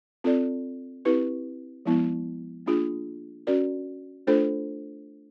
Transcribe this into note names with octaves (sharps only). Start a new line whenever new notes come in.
C4 F4 A4 D5
C4 E4 G4 B4
F3 G#3 B3 E4
A#3 D4 F4 G#4
C#4 F#4 A#4 D5
A3 D4 F4 A4 C5